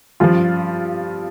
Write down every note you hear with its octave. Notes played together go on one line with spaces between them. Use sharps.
G2 F3 F4